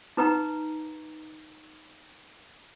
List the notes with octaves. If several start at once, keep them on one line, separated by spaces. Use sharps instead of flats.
D#4 B4 A#5